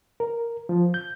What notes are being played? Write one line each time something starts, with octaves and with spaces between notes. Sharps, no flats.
A#4
F3
G6